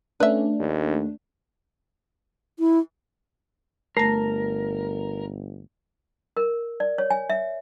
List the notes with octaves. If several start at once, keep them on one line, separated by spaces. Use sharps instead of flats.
A3 C#4 D4 B4 E5
D#2
E4
G1 A3 A#4 A#6
A#4
D5
C#5
G#5
E5